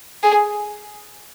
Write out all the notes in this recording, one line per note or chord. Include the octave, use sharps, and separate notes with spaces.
G#4